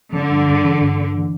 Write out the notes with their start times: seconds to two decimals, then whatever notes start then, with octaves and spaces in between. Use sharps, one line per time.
0.13 D3 F3
0.29 G2
0.47 G2
0.63 E3
0.81 G2
0.97 D4
1.15 E3